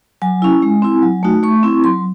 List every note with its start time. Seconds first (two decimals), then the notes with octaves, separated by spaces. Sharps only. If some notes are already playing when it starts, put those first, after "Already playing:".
0.22 F#3 G#5
0.42 C#4 E4
0.62 G#3
0.82 C4 E4
1.03 F#3
1.23 A3 D#4 F#4
1.43 A3 C#6
1.63 C4 E4
1.83 F#3 C6